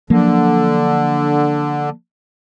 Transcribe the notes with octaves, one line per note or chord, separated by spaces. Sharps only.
D3 F3 F#3 A#3